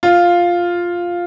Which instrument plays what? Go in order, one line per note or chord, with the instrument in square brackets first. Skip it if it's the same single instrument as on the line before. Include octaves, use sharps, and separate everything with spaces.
[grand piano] F4